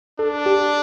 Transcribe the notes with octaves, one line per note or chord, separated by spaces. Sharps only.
D4 A4
G4